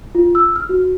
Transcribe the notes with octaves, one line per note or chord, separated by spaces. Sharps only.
F4
E6
F6
F#4